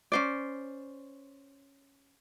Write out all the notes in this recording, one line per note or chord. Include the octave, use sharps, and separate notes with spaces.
C#4 C5 D5